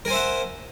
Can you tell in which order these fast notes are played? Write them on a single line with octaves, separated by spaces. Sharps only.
A#4 G#5 C5 E5 F#5